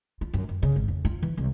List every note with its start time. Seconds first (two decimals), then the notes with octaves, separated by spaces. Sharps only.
0.21 F4
0.34 F#2
0.49 F#2
0.62 C#3
0.76 G#1
0.88 F2
1.05 F4
1.22 E3
1.37 C2